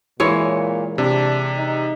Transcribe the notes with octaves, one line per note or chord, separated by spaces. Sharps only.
A#2 E3 G#3 C#5
C3 D4
D#4